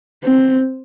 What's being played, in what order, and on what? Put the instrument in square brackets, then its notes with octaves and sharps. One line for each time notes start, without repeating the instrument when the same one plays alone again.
[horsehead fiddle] C4